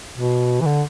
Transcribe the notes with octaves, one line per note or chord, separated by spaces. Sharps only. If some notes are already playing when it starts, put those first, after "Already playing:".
B2
E3
D3